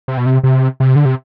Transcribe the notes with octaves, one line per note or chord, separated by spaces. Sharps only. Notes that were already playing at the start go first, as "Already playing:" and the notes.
C3
B2
C3
C3
C3
D3
C3